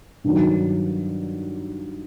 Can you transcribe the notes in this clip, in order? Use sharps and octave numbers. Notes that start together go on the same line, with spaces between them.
G2 D#3 F#3